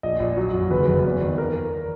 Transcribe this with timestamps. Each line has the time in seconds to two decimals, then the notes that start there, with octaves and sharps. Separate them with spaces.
0.03 A#1 D#5
0.20 A#1
0.37 F#3
0.54 F#2
0.71 F#1 B4
0.88 F#1
1.05 E2
1.22 D#3
1.38 A#4